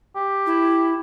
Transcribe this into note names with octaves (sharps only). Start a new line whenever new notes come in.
G4
E4